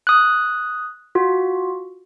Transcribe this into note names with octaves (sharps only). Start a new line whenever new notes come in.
D#6 F#6
F4 F#4